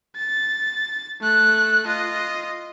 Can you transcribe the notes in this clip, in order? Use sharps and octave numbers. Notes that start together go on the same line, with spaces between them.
A6
A3 F#6
F4 D#5